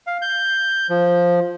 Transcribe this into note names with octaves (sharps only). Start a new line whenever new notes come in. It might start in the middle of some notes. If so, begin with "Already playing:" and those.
F5
G6
F3